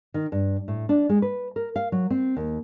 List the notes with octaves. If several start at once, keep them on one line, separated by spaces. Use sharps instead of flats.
D#3
G2
A2
D4
G#3
B4
A#4
F5
F#3
C4
D#2